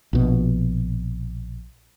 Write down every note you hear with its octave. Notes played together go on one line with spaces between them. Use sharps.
A#1 B2